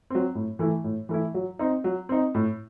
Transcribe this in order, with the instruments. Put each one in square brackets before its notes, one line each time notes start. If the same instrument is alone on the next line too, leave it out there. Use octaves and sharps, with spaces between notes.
[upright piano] F#3 C4
A2
E3 A3 E4
A2
E3 A3 E4
F#3
C4 D#4
F#3
C4 D#4
A2